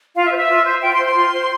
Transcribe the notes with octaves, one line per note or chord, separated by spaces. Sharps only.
F4 F5
E5
C5
E5
F4
C5
F4 G5
C6
C5
C6
F4
C5